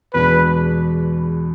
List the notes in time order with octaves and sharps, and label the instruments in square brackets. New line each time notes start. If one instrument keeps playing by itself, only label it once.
[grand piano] E2 B2 G#3 D4 [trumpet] B4